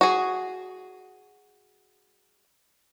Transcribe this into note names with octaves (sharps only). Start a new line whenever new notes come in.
F#4 G#4